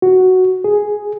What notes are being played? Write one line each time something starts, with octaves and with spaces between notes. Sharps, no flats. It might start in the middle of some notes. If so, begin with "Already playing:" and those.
F#4
G#4